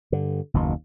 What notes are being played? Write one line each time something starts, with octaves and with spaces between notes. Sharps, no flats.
G2 D3
F#1 D#2 B2